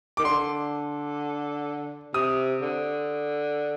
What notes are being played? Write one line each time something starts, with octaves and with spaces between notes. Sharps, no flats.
D#3 D6
D3 C6
C3 D#6
D3